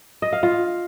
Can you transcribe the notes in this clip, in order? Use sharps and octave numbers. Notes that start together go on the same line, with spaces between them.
D#5
F5
F4